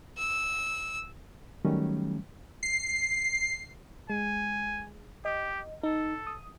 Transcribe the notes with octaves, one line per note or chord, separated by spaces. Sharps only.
E6
D#3 F#3 G3 A3 C#4
C7
G#3 G#5
G4 D#5
D#4 A4
D#6